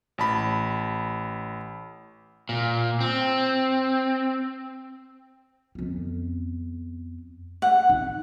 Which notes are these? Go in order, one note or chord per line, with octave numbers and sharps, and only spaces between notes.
A1 A5 B5
A#2
C4
F2 B3
F#5
D#4